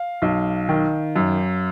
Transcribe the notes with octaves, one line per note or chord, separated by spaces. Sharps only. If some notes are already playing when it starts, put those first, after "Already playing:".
Already playing: F5
B1
D#3
F#2